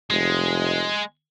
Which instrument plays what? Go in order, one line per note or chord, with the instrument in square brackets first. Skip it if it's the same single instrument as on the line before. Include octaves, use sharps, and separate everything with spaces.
[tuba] F1 [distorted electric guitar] G#3